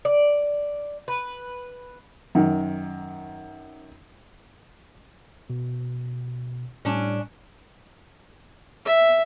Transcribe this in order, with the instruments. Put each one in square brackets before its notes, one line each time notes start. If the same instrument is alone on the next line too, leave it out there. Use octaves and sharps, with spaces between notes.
[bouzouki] D5
B4
[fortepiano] F#2 D#3
[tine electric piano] B2
[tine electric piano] A2 G3 G#5 [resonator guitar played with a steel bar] C#4 D4
[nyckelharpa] E5